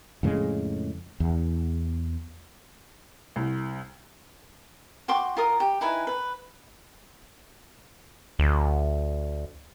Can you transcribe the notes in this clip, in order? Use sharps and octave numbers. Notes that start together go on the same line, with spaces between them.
F2 A2 C#3 G#3
E2
C2
F#4 G5 C6 D6
F4 A#4 D#6
G4
D#4 E4 B4 G#5
B4
D2